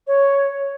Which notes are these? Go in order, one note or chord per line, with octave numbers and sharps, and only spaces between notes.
C#5